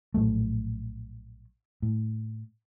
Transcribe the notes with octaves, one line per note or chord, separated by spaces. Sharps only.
A#1 A2 F#3 A3
A2